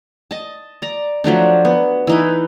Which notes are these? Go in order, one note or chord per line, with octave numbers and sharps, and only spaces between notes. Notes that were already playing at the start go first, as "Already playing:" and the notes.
D#5 A5
D5 A#5
F3 F#3 A3 D4
B3
E3 D#4 B4